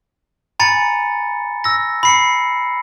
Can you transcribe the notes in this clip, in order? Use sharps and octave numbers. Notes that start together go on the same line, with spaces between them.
G#5 A#5 B5 A6 C#7
E6 A#6
B5 C7 C#7